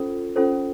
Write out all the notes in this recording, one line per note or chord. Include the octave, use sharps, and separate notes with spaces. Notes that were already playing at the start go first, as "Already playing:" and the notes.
Already playing: C#4 F4 A4 C5
C#4 F4 A4 C5